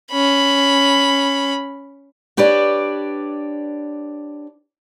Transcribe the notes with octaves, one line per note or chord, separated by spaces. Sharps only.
C#4 B5
D4 G4 B4 C#5 D5